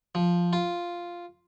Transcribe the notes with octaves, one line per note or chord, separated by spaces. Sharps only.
F3
F4